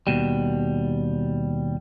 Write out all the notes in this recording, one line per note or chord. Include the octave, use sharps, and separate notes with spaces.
D#2 B2 G3